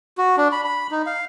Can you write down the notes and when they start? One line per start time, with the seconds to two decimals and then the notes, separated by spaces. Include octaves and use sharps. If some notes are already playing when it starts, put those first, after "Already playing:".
0.18 F#4
0.37 D4
0.52 B5
0.64 B5
0.91 D#4
1.06 F5